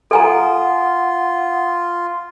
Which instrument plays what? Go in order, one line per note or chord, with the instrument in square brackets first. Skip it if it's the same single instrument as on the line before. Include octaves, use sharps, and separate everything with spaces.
[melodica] F4 [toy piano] A4 G#5 A#5 [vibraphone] F#5 D#6